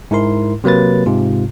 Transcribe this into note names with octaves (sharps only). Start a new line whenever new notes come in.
G#2 E4 A#4 C6
C3 F#3 A#3 B4 A6
G#2 C3 F4